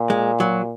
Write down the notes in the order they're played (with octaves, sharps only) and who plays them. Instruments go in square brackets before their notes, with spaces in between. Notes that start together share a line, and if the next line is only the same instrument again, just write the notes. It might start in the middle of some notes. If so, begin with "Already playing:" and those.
Already playing: [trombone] A#2
[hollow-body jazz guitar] G#3
F#3